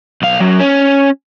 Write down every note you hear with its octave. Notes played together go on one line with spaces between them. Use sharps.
B1 F5
F#2 F#3
C#4